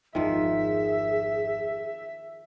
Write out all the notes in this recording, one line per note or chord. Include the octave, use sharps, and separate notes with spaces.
G#1 F2 D#3 F3 G#4 E5